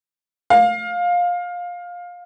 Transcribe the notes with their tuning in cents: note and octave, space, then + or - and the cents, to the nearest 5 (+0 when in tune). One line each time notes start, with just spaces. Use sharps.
F5 +15